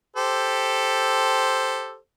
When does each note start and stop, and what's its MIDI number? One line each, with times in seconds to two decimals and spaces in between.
0.16 1.97 67
0.16 1.97 69
0.16 1.97 72